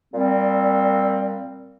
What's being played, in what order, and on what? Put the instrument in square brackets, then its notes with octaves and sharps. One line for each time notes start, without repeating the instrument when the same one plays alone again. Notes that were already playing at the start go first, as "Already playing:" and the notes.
[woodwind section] A#2 G3 C4